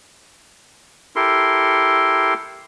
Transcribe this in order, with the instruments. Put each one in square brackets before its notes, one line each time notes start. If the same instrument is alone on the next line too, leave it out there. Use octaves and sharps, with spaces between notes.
[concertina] E4 G4 A4 A#4 C6